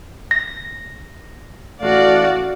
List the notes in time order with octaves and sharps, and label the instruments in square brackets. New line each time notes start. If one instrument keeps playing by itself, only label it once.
[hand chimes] A#6
[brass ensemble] A1 A3 F5 [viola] F#4 D5